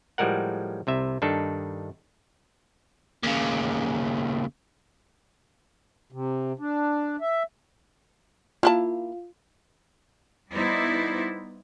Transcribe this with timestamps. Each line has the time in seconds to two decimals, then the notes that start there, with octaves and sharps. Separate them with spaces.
0.18 A2 F3 G3 G#3 A#4 F#5
0.87 C2 C3 E5
1.22 G2 D#3 D4 D#4 A4
3.24 D#2 C#3
6.12 C3
6.59 D4
7.21 E5
8.63 A#3 E4 F4 A5
10.52 G3 B3 D#4 E4 C5 D5